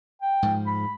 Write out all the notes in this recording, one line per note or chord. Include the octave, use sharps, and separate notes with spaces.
G5
G#2 F3
B5